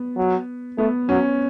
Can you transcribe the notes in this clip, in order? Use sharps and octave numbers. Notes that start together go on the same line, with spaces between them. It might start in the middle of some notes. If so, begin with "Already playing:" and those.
Already playing: B3
F#3
A3 B3
F#3 C#4